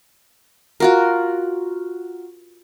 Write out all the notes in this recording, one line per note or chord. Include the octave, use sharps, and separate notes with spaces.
F4 F#4 A#4